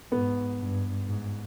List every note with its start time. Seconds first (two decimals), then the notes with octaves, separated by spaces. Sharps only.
0.11 G#2 B3
0.59 G2
1.07 G#2